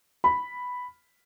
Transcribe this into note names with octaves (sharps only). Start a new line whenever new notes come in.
B5